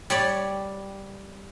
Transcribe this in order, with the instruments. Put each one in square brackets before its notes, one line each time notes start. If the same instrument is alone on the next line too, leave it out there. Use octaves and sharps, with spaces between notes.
[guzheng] G3 C#5 D5